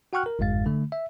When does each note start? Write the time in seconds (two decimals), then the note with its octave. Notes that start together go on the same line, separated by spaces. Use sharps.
0.13 F#4 F#5 G5 C#6 F6 F#6
0.26 A#4
0.39 G1 F2 G#2 G#3 F5 A6
0.66 D3 A3
0.92 E5